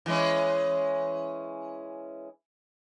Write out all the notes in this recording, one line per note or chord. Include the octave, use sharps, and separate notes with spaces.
E3 G#3 C#4